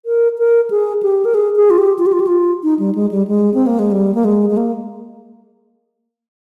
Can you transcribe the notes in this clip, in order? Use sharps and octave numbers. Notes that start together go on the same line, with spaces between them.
A#4
A#4
G#4
G4
A#4
G#4
G#4
F4
G4
F4
G4
F4
G4
F4
D#4
G3
G#3
G3
G#3
C4
A#3
G#3
G3
A#3
G#3
G#3
A#3